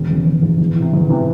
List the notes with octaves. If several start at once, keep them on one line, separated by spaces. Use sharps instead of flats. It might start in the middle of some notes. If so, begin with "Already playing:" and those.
Already playing: E1
E2 C#3
E1
E2 C#3
E2
C3 E3
E2
C3 E3